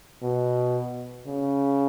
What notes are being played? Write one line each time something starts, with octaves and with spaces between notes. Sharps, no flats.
B2
C#3